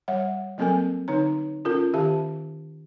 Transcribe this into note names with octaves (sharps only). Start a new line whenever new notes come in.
G3 C#5 E5 F#5
F#3 A#3 C4 A4 A#4 G#5
D3 D#4 C#5 A#5
C#4 F4 A4 A#4
D#3 G4 E5 F5 A5